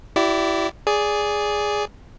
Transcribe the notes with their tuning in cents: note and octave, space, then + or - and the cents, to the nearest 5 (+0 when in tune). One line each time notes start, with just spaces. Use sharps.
E4 +10 G4 -40 D5 +0
G#4 +0 D5 -15